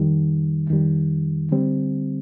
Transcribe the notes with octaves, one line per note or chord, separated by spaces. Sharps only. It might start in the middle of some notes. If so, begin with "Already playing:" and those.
Already playing: F2 D#3 G3
F2 D#3 G3
D3 G3 C4